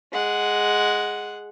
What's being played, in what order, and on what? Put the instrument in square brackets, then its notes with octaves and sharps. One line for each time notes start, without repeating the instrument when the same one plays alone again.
[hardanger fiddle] G#3 F#5